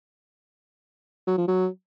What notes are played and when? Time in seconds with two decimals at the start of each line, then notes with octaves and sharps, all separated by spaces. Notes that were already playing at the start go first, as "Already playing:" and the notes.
1.27 F#3
1.38 F3
1.48 F#3